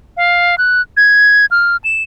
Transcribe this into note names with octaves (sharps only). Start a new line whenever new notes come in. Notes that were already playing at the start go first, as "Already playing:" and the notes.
F5
F#6
G#6
F6
E7